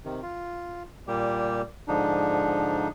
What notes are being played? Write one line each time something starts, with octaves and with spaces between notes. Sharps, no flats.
C3 D#3
F4
A#2 G3 A#3 G4
G#2 D3 F3 D4 D#4